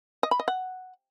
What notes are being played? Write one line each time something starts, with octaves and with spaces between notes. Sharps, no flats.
D#5
B5
D#5
F#5